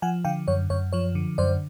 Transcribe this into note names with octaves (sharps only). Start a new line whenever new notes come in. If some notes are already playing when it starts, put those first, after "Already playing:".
F3 F#5 G#5
D3 F5 G5
F#2 C#5
F#2 C#5
F3 C#5
D3
F#2 C5 D5